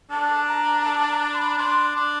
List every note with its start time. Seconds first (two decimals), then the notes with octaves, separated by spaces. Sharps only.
0.11 D4 A5
0.48 A#5
0.84 A5
1.10 A#5
1.34 C6
1.38 B5
1.57 D4 C6
1.95 D4